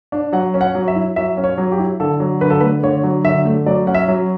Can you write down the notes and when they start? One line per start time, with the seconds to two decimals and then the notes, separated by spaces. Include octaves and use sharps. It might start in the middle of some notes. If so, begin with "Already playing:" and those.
0.12 D4
0.33 F#3 F#5
0.54 C#4
0.61 F#5
0.75 F#3
0.88 E5
0.96 E4
1.16 F#3 E5
1.37 C#4
1.44 C#5
1.58 F#3
1.72 G4
1.79 E4
2.00 D3 A4
2.20 F#3
2.41 D3 B4
2.50 A4
2.61 A3 B4
2.83 D3 C#5
3.03 F#3
3.24 D3 E5
3.45 A3
3.66 F#3 D5
3.87 C#4 F#5
3.94 E5
4.08 F#3